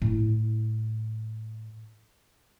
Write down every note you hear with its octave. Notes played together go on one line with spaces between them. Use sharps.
A2 E4